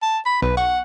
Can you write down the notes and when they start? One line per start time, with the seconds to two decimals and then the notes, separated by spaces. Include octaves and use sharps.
0.02 A5
0.26 B5
0.42 B1 B4
0.57 F#5 C#6